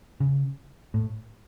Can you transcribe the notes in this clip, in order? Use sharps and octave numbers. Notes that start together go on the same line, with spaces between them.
C#3
A2